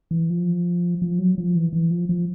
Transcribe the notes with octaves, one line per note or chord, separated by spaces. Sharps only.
E3
F3
F3
F#3
F3
E3
E3
F3
F3